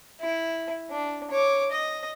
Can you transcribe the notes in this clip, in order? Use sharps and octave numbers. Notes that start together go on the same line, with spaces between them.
E4
D4
C#5 D6
D#5